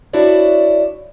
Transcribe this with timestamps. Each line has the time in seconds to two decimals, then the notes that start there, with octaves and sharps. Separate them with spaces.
0.13 D4 E4 F#4 C#5 D5 E5